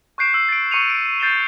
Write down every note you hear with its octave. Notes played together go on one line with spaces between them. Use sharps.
C#6 F#6 G6 C7 D7 E7
E6
A6 D7
C#6 C#7 D#7 F7
D7
G6 A6 C7 D#7 E7 G7